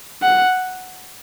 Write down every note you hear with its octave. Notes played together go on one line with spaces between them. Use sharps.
F#5